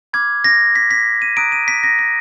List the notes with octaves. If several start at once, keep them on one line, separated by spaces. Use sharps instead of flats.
B5 D6 F6 G#6
A#6
B6
B6
D#7
A#5 D#6 F#6 D7
D#7
B6
A#6
B6